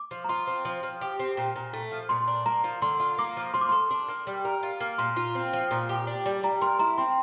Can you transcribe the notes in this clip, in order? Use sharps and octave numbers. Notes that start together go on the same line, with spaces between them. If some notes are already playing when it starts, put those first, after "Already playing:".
Already playing: D6
F3
A#5
F4 C6
C4
F3
F3
G4
C4
A#2
A#2
A3
F3
A#2 C6
D4
A#3 A#5
F3
D3 C6
F4
A#3 D6
F3
F3 C6
D6
A4 C6
D4
A#3
G3
A#4
F4
A#3
A#2 C6
F4
C4
F3
A#2
G4
D4
G3
G3 A#5
A#4 C6
E4 A#5
C4 C6